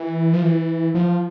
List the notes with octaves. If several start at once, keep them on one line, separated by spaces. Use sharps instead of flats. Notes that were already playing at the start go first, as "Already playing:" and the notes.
Already playing: E3
F3
E3
F3